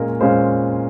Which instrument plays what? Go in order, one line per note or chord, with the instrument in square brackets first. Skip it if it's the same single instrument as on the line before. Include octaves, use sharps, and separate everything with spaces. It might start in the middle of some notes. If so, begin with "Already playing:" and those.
Already playing: [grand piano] A#2 G#3 C#4 A#4
A#2 G#3 C#4 C5